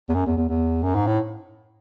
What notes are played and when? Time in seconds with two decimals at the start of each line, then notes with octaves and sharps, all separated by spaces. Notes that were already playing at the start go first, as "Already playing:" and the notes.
0.09 E2
0.14 F#2
0.26 E2
0.37 E2
0.49 E2
0.83 F#2
0.95 G#2
1.07 A2